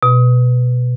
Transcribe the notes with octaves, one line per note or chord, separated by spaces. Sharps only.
B2